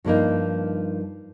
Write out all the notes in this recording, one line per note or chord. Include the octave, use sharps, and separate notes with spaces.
G2 F3 A#3 D#4